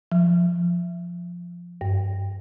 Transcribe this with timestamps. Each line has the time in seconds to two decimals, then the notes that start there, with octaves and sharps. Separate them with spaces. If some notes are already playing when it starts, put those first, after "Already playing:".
0.12 F3
1.81 G2